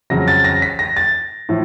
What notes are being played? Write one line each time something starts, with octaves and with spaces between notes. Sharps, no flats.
F2 C#3 F#3 A#6
A6
A#6
B6
A#6
A6
A2 F3